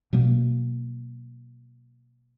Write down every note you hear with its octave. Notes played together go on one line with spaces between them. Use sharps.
B2 F#3 A#3